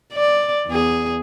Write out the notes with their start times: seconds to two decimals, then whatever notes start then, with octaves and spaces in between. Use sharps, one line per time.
0.13 D5
0.67 E2 G#4